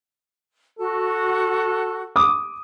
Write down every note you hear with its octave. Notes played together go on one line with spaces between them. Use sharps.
F#4 A4
D6 D#6